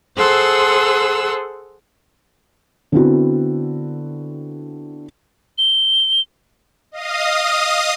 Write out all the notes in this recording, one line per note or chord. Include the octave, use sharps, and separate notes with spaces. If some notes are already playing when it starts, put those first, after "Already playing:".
G#4 A4 C5 F#5 C6 E6
D3 B3 C4 E4 F#4
G7
D#5 F5 D#6